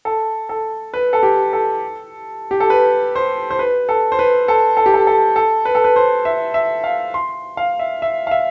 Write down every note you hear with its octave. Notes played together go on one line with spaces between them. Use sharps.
A4
A4
B4
A4
G4
A4
G4
A4
B4
C5
C5
B4
A4
C5
B4
A4
A4
G4
A4
A4
A4
B4
A4
B4
C5
E5
E5
F5
C6
F5
E5
E5
F5
E5